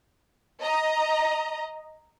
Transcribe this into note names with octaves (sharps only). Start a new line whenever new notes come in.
D#5 A#5